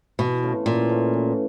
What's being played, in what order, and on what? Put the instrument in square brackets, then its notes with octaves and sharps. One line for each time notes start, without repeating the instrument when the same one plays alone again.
[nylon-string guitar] B2 [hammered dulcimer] E3
[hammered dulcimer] A3 C#4 F4
[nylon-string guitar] A#2 [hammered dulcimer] E3
[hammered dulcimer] A3 C#4 F4
E3